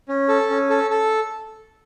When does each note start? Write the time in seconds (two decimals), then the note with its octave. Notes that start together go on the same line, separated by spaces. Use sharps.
0.08 C#4
0.28 A4
0.50 C#4
0.70 A4
0.91 A4